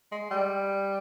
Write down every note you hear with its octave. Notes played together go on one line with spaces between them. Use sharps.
G#3
G3